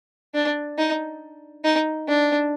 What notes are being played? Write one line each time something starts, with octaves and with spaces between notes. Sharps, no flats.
D4
D#4
D#4
D4